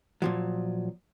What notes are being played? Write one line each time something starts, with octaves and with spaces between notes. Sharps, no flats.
A#2 F3 F#3